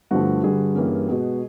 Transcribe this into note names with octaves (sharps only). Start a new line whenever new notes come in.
G2 D3 F3 A3 F#4
G2 D3 G3 F#4 G#4
G2 E3 G3 A#3 C#4
B2 G#3 B3